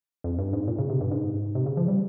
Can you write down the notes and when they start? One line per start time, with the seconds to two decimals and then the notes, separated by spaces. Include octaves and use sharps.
0.24 F2
0.39 G2
0.53 G#2
0.68 A#2
0.78 C#3
0.90 C3
1.01 G2
1.11 G#2
1.55 C3
1.66 C#3
1.77 F3
1.88 G3